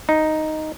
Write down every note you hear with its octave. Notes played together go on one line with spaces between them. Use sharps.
D#4